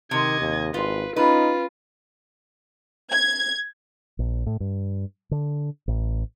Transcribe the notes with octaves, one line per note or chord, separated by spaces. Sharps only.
C3 D#3 D#5 G#6
D#2
G#1 F4 B4
C#4 D#4 F4 B4
G#6
A#1
A2
G2
D3
A1